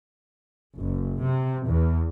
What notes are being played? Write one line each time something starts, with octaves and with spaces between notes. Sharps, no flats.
F#1
C3
E2